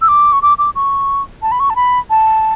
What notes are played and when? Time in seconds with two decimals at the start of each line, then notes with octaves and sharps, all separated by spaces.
0.02 E6
0.08 D6
0.33 C#6
0.42 D6
0.58 D6
0.75 C#6
1.42 A5
1.52 B5
1.60 C#6
1.70 A5
1.76 B5
2.10 A5